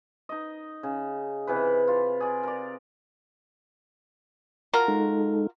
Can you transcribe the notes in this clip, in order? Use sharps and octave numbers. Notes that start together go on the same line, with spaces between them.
D#4 D#5
C#3
C3 E3 B4
F4
G#4 D5
A#4 D5
F4 F#4 A#4
G#3 D#4 A4